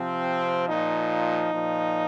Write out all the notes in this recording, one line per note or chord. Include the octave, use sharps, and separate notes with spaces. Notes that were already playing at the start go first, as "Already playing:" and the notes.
Already playing: C3 F3 C4
A#2 F3 D#4
A#2 F3